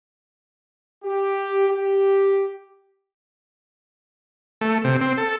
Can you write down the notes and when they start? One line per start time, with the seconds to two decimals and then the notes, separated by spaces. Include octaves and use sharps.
1.04 G4
1.70 G4
4.61 A3
4.84 C3
5.01 C4
5.18 A4